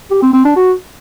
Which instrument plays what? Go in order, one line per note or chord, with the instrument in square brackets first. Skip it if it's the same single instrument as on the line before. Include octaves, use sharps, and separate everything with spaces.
[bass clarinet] G4
C4
C4
D4
F#4